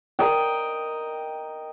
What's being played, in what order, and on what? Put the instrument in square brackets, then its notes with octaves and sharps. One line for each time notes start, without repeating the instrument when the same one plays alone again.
[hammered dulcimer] A#4 D#5 G5